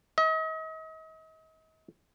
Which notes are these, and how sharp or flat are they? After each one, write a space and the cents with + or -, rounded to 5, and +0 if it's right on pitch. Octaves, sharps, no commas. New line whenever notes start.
D#5 +40